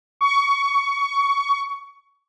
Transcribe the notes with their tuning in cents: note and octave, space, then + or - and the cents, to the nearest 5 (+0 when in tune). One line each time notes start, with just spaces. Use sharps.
C#6 +20